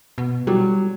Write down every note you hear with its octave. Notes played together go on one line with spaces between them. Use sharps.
B2
F#3 G3